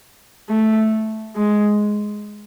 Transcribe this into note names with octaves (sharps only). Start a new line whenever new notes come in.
A3
G#3